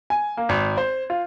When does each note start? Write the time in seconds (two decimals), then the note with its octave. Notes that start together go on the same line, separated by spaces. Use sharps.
0.10 G#5
0.37 A#3
0.49 G#1
0.77 C5
1.10 F4